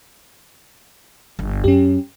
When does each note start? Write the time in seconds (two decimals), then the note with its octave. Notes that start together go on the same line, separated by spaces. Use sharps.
1.39 G1
1.64 F#2 C#4 G4